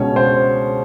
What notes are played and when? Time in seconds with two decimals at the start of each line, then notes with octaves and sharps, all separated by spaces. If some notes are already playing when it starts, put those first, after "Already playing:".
Already playing: C#2 B2 G#3 C#4 C#5
0.16 C5